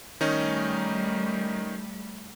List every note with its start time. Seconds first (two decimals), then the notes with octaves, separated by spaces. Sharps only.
0.21 D#3 G3 A3 C#4 D#4